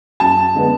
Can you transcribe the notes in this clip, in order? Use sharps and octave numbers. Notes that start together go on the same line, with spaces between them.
F#2 A5
D3 G#3 B3